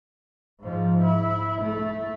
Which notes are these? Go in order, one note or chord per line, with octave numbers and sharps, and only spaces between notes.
G#2 F3
E4
A3